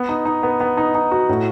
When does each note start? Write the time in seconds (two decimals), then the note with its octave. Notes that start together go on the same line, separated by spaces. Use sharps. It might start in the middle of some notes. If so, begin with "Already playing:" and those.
Already playing: B3
0.09 D#4
0.25 D#4
0.43 B3
0.60 B3
0.77 D#4
0.95 D#4
1.11 F#4
1.29 A2